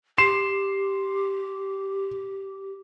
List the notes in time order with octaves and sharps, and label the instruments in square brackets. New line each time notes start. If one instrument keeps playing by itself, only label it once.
[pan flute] G4 [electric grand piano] C6 C7 E7